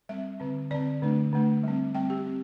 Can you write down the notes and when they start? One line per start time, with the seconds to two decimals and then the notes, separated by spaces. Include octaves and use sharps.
0.09 G3 C4 E5
0.40 D3 C4
0.70 D3 C4 D5
1.02 D3 A3 D4
1.33 D3 A3 D4
1.63 G3 C4
1.95 G3 C4 G5
2.10 G4
2.27 C4